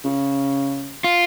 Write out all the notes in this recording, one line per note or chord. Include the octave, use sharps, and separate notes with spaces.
C#3
F4